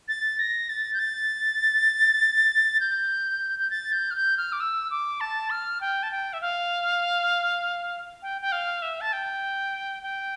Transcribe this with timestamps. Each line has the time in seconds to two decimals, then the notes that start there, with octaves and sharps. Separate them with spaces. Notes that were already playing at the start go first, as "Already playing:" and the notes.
0.08 A6
0.39 A#6
0.69 A6
0.94 G6
0.99 A6
2.80 G6
3.60 G6
3.70 A6
3.92 G6
4.11 F6
4.15 G6
4.38 F6
4.52 D6
4.60 E6
4.91 D6
5.21 A5
5.50 F6
5.81 G5
6.03 A5
6.11 G5
6.33 E5
6.41 F5
8.22 G5
8.42 G5
8.52 F5
8.82 E5
9.01 A5
9.13 G5
10.03 G5